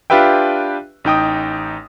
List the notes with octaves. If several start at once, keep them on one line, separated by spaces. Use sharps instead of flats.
D4 F4 G4 B4 E5 G5
A1 D#4 G5 D#6